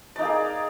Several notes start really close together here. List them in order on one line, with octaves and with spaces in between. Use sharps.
D5 D#4 A#3 G#4